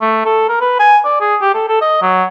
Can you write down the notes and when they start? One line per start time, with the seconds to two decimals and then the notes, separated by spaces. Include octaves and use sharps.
0.01 A3
0.25 A4
0.49 A#4
0.61 B4
0.79 G#5
1.05 D5
1.20 G#4
1.41 G4
1.54 A4
1.68 A4
1.81 D#5
2.02 F#3